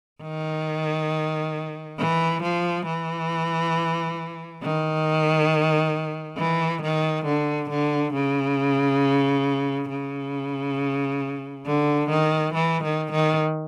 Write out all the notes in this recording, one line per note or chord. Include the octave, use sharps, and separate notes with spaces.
D#3
E3
F3
E3
D#3
E3
D#3
D3
D3
C#3
C#3
D3
D#3
E3
D#3
D#3